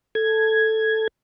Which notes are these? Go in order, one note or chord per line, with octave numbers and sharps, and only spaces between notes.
A4 G#6